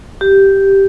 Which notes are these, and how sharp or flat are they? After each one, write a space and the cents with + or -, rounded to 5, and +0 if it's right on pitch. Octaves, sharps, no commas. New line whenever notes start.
G4 -5